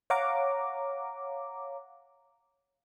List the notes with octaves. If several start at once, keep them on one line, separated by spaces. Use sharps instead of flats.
C#5 F5 F#5 A#5 D6